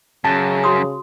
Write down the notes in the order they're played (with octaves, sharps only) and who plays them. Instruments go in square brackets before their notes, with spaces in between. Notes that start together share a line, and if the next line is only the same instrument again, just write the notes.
[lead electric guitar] F#2 [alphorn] C#3 [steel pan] A5
[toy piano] F#4 C6 D#6